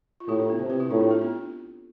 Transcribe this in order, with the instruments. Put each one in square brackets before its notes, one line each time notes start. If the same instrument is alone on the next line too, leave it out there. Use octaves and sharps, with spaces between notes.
[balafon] F4
[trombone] A2 [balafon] E4 G4
[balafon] D4 F4
B3
[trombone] C3 [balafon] C4
[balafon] G4 B4
E4 G4
[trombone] A2 [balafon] D4 F4
[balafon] D4 F4
F4 A4
B3 D4